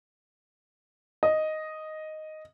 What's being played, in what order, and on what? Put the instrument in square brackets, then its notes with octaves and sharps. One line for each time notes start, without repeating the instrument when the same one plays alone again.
[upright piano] D#5